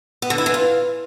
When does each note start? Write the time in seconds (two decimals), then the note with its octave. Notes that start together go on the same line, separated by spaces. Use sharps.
0.22 B3
0.30 D3
0.38 E4
0.46 E3
0.54 F4